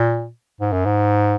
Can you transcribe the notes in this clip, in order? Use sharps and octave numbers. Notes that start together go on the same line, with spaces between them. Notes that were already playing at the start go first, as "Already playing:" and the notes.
Already playing: A#2
G#2
F#2
G#2